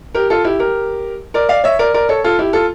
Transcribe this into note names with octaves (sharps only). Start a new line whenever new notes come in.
G4 A#4
F4 A4
E4 G4
G4 A#4
A#4 D5
D5 F5
C#5 E5
A#4 D5
A#4 D5
A4 C#5
F4 A4
E4 G4
F4 A4